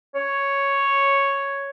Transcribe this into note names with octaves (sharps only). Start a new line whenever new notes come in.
C#5